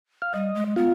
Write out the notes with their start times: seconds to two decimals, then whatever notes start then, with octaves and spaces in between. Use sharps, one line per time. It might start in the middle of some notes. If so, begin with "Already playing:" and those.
0.22 F5
0.34 G3 D#5
0.55 G#3
0.76 B3 F4